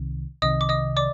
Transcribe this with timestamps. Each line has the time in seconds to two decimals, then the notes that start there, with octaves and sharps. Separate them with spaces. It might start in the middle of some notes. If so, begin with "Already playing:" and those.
Already playing: C2 C3 D#3
0.42 C2 C3 D#3 D#5 D#6
0.61 D6
0.69 D#5 D#6
0.97 D5 D6